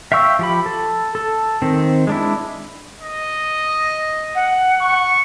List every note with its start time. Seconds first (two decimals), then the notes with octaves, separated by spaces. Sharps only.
0.12 E5 F5 G5 C#6 E6
0.39 F3 G4 B5
0.66 A4
1.15 A4
1.62 D#3 C4
2.07 G#3 D4 E4
3.00 D#5
4.35 F#5
4.81 C#6